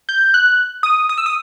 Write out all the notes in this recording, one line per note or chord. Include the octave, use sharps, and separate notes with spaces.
G6
F#6
D#6
D#6
E6
D#6